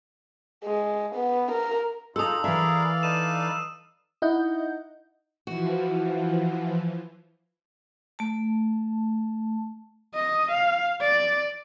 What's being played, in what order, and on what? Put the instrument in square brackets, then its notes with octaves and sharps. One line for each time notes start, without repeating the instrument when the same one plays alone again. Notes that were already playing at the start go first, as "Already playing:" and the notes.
[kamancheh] G#3
B3
A#4
[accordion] G#3 D#4 F4 [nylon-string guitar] A4 A5 [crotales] D#6 E6
[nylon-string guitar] E3 E5 [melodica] G#4 A#4 B4 [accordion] D5 F5
[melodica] D#4 A4 B4 [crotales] D#7 E7
[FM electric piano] D#4 E4 D#5 F#5 G6
[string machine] E3 F3 [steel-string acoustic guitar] F#4
[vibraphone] A3 A5
[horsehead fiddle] D#5
F5
D5